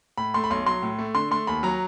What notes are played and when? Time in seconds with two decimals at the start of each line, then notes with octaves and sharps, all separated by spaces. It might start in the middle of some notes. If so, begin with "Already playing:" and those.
0.17 A2 B5
0.34 A3 C6
0.44 B5
0.50 B1 C6
0.66 F#3 C6
0.82 A2
0.99 A3
1.15 D3 C6
1.31 A3 C6
1.47 D#2 B5
1.63 F#3 A#5